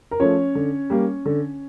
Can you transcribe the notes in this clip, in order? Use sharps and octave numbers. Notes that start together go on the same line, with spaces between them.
A#4
F3 A3 C#4 C#5
D3
G3 A#3
D3